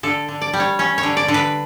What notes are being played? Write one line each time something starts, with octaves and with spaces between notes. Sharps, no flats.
D3 A4
D3
D5
G3
C#5
C#4 C#5
C#5
D3
D5
D3
B4